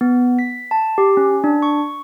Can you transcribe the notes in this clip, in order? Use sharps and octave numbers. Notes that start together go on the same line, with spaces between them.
B3
B6
A5
G4
C#4
D4
C#6